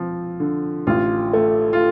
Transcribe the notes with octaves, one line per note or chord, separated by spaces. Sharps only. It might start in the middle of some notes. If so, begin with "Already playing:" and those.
Already playing: F3 C4
D3
A1 F4
A3
F4